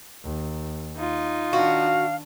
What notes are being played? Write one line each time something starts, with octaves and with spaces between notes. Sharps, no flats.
D#2
D#4 F4
D#3 D4 F#4 F5